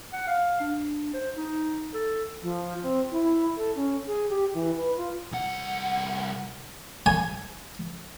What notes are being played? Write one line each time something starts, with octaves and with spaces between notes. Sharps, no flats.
F#5
F5
D4
C5
D#4
A4
F3
C4
E4
A4
C#4
G#4
G4
E3
B4
F4
C2 F#5
G#5